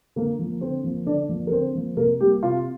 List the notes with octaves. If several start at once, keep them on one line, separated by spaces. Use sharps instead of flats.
D3 A#3 A#4
F3 A#3
D3 C4 C5
F3 A#3
D3 D4 D5
F3 A#3
A#4
D3 C4 C5
F3 A#3
C3 A#3 A#4
G3 A#3 G4
C3 F4